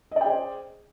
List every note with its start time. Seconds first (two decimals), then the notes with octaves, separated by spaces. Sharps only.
0.11 D#5
0.16 D5
0.21 G5
0.26 G#4
0.30 C5